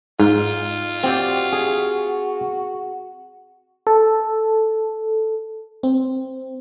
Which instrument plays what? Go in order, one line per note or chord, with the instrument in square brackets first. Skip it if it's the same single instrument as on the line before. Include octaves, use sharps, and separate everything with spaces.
[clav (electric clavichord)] G#2 [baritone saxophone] F4
[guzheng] C4 G4 D5 [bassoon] F#4
[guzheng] G#4
[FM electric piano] A4
C4